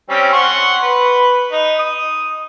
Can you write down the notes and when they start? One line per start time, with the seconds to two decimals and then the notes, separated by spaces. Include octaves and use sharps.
0.10 G3 C4 C#4
0.33 F#5 C6 C#6
0.83 B4 B5
1.52 D#4
1.79 D#6